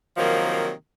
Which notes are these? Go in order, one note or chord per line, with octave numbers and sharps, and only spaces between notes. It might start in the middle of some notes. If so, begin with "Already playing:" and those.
C3 D#3 F3 F#3 A#3